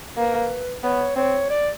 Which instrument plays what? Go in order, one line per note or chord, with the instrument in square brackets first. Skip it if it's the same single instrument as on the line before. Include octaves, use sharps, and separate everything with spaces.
[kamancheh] A#3 [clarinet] B4
[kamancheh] B3 [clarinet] C#5
[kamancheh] C4 [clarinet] C#5
[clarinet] D5